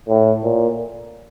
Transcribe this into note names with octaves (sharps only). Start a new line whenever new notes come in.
A2
A#2